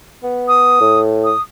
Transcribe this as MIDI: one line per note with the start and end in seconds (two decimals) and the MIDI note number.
0.24 0.76 59
0.48 1.00 87
0.81 1.32 45
1.24 1.41 87